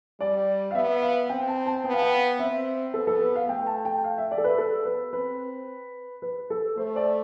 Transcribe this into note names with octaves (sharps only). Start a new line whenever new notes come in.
G3 D5
F5
B3 E5
F5
C4 G5
A5
A5
B3 G5
F5
G5
F5
C4 E5
B3 A4
A4
B4
F5
A3 G5
A5
G5
F5
E5
D5
A4
B4
B3 A4
B4
C4 B4
B4
A4
A3 C5
D5